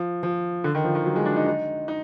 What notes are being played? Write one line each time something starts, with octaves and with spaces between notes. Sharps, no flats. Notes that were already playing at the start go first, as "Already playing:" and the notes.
Already playing: F3
F3
D3
D#3
F3
D#3
F#3
G#3
D4
D#4
D#4
D#4